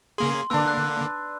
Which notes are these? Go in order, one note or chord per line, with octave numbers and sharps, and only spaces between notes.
C#3 A#3 G#4 C6
D3 A#3 D4 B4 E6
F#6